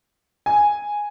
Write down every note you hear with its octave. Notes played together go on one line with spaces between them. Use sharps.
G#5